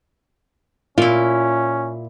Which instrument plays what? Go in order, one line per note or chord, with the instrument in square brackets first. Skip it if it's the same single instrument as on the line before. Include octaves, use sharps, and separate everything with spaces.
[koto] A#2 E4 [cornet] C#4 [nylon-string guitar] F4